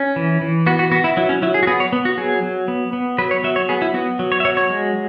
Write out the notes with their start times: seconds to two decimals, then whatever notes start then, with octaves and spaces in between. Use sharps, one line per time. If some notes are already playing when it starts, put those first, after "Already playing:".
Already playing: C#4
0.16 E3
0.41 E3
0.67 B3 F#4
0.79 F#4
0.92 B3 F#4
1.04 E4
1.17 F#3 E4
1.29 C#4
1.42 F#3 E4
1.54 G#4
1.63 F#4
1.67 B3 G#4
1.80 C#5
1.93 B3
2.05 F#4
2.18 F#3 G#4
2.43 F#3
2.68 B3
2.93 B3
3.18 F#3 B4
3.31 C#5
3.44 F#3 E5
3.56 C#5
3.69 B3 G#4
3.82 E4
3.94 B3 F#4
4.19 F#3
4.32 C#5
4.40 E5
4.45 F#3 C#5
4.57 C#5
4.70 G#3